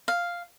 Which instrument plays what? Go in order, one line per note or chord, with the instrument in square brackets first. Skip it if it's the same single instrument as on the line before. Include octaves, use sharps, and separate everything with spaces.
[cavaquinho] F5